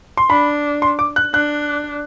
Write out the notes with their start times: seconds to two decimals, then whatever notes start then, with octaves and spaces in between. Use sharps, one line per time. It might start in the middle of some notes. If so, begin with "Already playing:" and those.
0.17 C6
0.30 D4 B5
0.82 C6
0.99 D6
1.16 F#6
1.34 D4 F#6